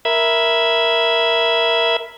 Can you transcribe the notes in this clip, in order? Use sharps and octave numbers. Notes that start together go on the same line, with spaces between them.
A#4 E5 B5 E6 G#6